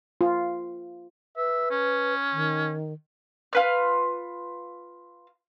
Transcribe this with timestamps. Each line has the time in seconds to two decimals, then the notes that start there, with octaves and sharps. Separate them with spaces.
0.21 F4
1.37 B4 E5
1.71 C#4
2.32 D#3
3.53 F4 B4 F6